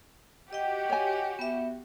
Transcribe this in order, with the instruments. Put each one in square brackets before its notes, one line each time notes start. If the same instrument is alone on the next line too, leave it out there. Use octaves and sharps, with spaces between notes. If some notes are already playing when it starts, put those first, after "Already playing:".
[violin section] F#4 G4 F#5 [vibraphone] D#5 G5
[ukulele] C#5 G#5
[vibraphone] B3 E5